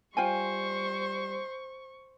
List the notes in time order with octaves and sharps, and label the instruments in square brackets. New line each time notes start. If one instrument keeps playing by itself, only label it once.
[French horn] G3 [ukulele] F4 G5 G#5 [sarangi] C5 [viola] C#6